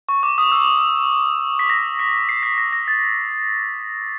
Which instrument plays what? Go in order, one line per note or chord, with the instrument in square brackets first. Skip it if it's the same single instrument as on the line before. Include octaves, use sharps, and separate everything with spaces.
[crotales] C#6
D6
D#6
E6
B6
A#6
B6
C7
B6
A#6
A#6
A6